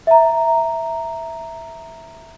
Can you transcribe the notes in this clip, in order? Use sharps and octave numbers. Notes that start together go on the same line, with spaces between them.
E5 A#5